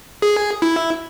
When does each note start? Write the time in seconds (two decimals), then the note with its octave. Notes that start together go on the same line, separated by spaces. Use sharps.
0.22 G#4
0.62 E4